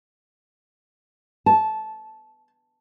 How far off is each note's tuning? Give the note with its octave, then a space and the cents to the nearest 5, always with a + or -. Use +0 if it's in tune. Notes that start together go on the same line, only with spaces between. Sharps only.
A5 -15